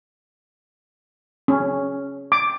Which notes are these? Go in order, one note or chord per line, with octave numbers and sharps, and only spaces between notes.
C#4
D6